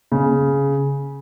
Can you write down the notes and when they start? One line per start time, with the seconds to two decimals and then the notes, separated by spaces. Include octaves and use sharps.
0.12 C#3